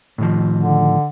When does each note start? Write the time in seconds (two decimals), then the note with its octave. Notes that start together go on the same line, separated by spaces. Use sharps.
0.18 A2 D#3 F3
0.56 D3